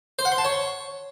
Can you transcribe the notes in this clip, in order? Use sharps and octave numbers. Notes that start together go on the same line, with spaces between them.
C5
F#5
C6
A5
C#5